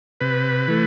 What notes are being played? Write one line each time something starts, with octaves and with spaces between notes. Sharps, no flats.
C3 B4
E3 A3